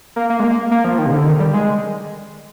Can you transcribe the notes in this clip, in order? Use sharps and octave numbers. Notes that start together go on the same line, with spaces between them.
A#3
A#3
G#3
A#3
A#3
F3
D#3
C3
D3
D#3
G3
G#3